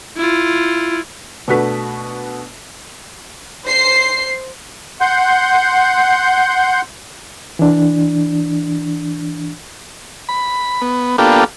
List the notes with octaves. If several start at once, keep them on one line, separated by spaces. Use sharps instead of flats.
E4 F4
B2 A3 D4 F#4 B4 B6
C5 C7
F#5 C6 G6
E3 D4
B5
B3
A#3 B3 D4 F4 G4 A4